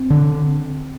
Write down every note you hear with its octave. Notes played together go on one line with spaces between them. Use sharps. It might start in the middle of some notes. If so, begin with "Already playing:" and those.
Already playing: C4
D3